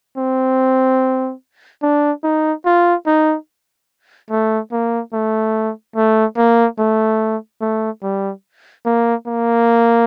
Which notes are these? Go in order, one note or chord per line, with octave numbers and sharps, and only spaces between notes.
C4
D4
D#4
F4
D#4
A3
A#3
A3
A3
A#3
A3
A3
G3
A#3
A#3